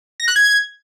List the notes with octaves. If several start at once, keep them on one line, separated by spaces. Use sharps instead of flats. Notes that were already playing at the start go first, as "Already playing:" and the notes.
A#6
F#6
G#6